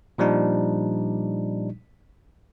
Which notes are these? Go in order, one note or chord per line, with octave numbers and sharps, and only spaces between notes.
A#2 F3 G3 D4 D#4